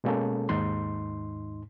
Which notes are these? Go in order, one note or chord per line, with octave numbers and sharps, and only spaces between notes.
B2 G#3 A#3 C#4 A4
D#2 G#2 D#4 C6